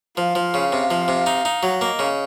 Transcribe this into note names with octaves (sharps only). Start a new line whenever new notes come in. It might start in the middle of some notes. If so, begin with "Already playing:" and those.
F3 F5
F3
C#3
C3 F5
F3
C3
D#4
D#4
F#3
A#3 D#5
C#3